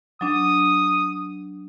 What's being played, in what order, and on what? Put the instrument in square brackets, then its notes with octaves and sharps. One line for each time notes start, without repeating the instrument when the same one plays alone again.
[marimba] F#3 D4 [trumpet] D#6